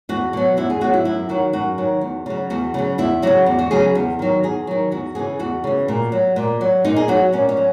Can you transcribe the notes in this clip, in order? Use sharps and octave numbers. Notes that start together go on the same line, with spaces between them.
E2 F#4
B2 F#3
E2 E4
G#4
B2 F#3 F#4
E4
F#2 E4
D#3 F#3 F#4
F#2 F#4
D#3 F#3
E2
C#3 F#3
E2 F#4
C#3 F#3
E2 E4
C#3 F#3 F#4
E2
F#4
C#3 F#3 G#4
E2
D#3 F#3
E2 G#4
D#3 F#3
E2 F#4
C#3 E3 G#4
E2 F#4
C#3 E3
A#2
F#3
A#2
F#3
A#2 D#4
G#4
F#3 F#4
A#2 C#4
C#4
F#3